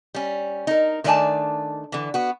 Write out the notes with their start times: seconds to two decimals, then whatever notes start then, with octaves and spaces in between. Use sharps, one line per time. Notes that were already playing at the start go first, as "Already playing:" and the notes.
0.14 G3 C#4
0.67 D#4 A#4
1.04 D#3 A3 D4 D5 G#5 A5
1.92 D3 E3
2.14 B3 F#4